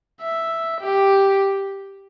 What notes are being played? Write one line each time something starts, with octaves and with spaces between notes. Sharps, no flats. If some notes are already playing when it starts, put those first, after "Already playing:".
E5
G4